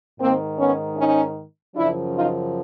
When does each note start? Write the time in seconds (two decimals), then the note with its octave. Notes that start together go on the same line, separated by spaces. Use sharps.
0.19 G#2 D#3 A#3 C4
0.58 B3 C#4
0.97 C#4 D#4
1.75 F#2 C#3 F3 D4 E4
2.14 D#4 F4